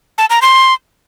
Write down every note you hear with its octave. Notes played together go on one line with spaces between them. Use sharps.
A5
A#5
C6